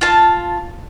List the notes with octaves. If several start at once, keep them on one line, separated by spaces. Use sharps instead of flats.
F4 A5